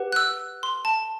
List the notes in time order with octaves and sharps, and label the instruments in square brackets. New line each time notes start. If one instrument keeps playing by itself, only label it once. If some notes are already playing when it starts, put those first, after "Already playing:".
Already playing: [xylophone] G4 B4 F#5
F#6
E6
C6
A5